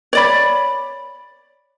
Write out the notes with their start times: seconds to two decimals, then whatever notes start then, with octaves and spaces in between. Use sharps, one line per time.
0.13 C#5 D5 B5